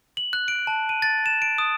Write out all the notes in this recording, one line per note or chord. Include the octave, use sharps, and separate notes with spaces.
F#7
F#6
D7
A5
D#7
A6
E7
D7
D#6